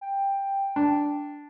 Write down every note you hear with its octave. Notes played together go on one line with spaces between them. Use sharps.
G5
D4